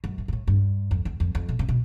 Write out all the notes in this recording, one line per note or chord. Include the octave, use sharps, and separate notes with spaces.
F#2
G#2
G#2
A2
G2
F2
E2
F2
F2
B2
C3
B2